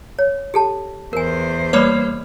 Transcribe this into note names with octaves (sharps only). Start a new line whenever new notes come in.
C#5
G4 A4 A5
E2 A#4 C5 G#5
G3 A#3 B4 C#5 D5